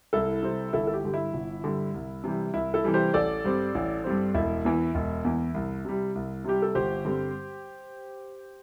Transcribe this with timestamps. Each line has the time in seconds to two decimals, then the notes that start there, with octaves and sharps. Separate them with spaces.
0.13 C2 E4 A4
0.43 C3 G3 C4
0.73 G1 E4 A4
0.87 A4
0.93 G4
1.04 G2 D3 G3
1.14 E4
1.34 G1
1.64 G2 D3 G3
1.94 C2
2.24 C3 E3 G3
2.54 C2 E4
2.74 E4 A4
2.84 C3 E3 G3
2.94 G4 C5
3.14 A1 A4 D5
3.44 G2 G3 C4
3.75 A1
4.04 G2 G3 C4
4.35 E1 E4
4.65 E2 E3
4.95 E1
5.24 E2 E3
5.54 C2
5.85 C3 G3
6.15 C2
6.45 C3 G3 G4
6.62 A4
6.75 G1 G4 C5
7.05 G2 D3 G3 C4